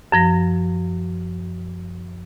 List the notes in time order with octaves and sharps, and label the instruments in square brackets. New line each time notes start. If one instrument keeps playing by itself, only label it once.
[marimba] F#2 F3 A#6